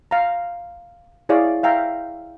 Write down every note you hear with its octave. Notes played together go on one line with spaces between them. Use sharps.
F5 A#5
E4 G#4 C#5 D5 F5
E5 F5 G5 A#5